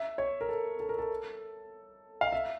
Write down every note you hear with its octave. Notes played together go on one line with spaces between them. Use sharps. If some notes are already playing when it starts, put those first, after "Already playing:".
Already playing: E5
C#5
A#4
A4
A4
A#4
A4
F5
E5